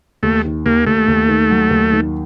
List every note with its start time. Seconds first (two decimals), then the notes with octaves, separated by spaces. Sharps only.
0.23 D#2 A3
0.45 D#3
0.66 D#2 A#3
0.86 D#2 A3
1.08 D#2
1.29 D#3
1.50 F#3
1.71 D#2
1.92 D#3